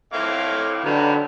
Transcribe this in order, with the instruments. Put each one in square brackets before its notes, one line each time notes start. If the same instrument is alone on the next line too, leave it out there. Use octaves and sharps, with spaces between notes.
[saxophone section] F2 A2 [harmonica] E5 F5 D6
[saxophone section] B2 D#3 G3 [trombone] D3 [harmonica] F#3 F#4 B4